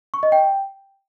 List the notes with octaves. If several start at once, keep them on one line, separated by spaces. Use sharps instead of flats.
C#6
D#5
G5